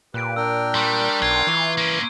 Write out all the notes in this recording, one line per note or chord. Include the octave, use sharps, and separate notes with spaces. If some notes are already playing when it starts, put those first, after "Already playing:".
A#2 G4 B4 F#6 D7
D4 A#4 G5 E6
G3 C6 C#6 F#6
B1 F4 G#6
E3 A#5 C#6 D6
A#3 C#4 C7 D7 D#7